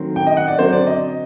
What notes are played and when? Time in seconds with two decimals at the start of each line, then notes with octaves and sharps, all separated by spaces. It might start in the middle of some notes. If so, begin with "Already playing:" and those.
Already playing: D#3 F#3 A3 C4
0.16 G5
0.27 D#5
0.37 F#5
0.48 D5
0.58 D3 F#3 C4 C5
0.73 D5
0.87 D#5